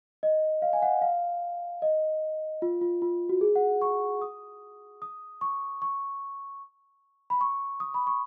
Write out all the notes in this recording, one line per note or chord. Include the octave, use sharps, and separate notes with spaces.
D#5
F5
G#5
F#5
F5
D#5
F4
F4
F4
F#4
G#4
F#5
C#6
D#6
D#6
C#6
C#6
B5
C#6
D#6
B5
C#6